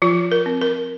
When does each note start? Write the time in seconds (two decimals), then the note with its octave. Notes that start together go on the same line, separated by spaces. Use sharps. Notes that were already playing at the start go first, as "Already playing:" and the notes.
0.02 F3 F4
0.32 A#4
0.46 C4
0.62 A#4